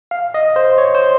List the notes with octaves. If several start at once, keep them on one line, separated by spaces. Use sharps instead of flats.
F5
D#5
C5
C#5
C5